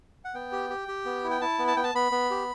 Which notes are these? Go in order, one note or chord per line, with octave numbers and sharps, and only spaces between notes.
F#5
B3 G5
G4
G4
G4
B3
E4
G5
E4 A5
B3
A5
B3 G5
A5
B3 B5
B3
G4